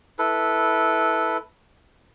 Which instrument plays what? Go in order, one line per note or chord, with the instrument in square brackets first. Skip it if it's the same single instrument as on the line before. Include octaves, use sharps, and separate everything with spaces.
[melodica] E4 A4 B4